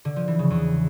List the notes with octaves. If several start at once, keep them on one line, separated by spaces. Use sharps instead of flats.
D3
F3
E3
C#3
E2